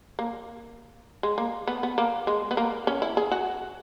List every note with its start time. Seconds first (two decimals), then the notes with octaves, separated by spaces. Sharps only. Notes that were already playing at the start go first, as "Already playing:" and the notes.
0.19 A#3
1.23 G#3
1.38 A#3
1.67 B3
1.83 B3
1.98 A#3
2.27 G#3
2.51 B3
2.57 A#3
2.87 C#4
3.02 E4
3.17 G#4
3.31 F#4